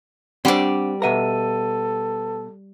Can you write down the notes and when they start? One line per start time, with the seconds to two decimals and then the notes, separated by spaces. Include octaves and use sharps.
0.45 G3 C4 D4 C5 D5 F#5
1.02 B2 A4 B4 E5 F#5 A#5 D#7